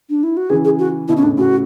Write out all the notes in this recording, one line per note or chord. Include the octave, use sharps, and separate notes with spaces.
D4
E4
F#4
C#3 E3 G#4
G#4
F#4
B2 D3 E4
C#4
A2 C#3 D4
A2 C#3 F#4